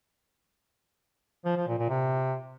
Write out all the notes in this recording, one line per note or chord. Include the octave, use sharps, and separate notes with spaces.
F3
F3
A#2
A#2
C3